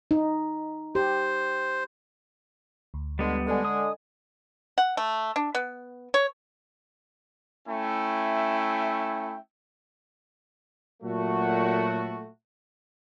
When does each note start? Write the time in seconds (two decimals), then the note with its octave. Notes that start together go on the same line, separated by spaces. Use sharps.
0.11 D#4
0.95 G4 C5
2.94 D2
3.19 D3 G3 G#3 B3
3.47 D3 G#3 D#5 G#5
3.65 D#6
4.78 F#5
4.97 A3
5.36 D4
5.55 B3
6.14 C#5
7.68 A3 C#4 E4 E5 G5
11.03 A#2 F#3 A3 F#4